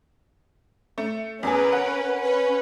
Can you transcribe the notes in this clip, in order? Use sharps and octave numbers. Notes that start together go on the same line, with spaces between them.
A3
E2 C#4 G#4 A#4 B4
F#5
C#4 B4